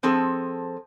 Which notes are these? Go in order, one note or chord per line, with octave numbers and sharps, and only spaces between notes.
F3 C4 G#4 A4